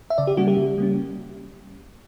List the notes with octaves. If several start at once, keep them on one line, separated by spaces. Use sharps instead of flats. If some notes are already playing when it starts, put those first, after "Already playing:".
E5
C#3 D5
G4
G3 A#3 C#4 F#4
G4
C#3
G3 A#3 C#4